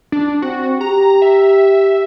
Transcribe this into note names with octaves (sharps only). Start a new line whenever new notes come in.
D4
C4 F#4
G4 A#5
E5